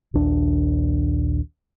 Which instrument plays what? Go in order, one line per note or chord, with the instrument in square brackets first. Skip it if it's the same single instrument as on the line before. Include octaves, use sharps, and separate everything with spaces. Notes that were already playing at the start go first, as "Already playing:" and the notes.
[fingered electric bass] A#1 D#2 D4